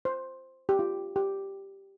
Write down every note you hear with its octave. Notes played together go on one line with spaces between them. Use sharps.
C5
G4
F4
G4